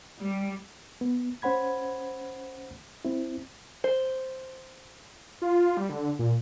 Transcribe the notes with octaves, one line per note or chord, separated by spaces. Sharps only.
G3
B3
C#4 C5 F#5 B5 G#6
C4 E4
C5
F4
G3
D3
A#2